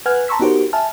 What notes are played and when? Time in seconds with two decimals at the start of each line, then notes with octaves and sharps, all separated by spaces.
0.06 B4 F#5 G#5 F6 F#6 G#6
0.28 A5 A#5 C6 C#6 E6 B6
0.40 B3 D#4 F#4 G4 A#4 C5
0.73 E5 G#5 A5 F6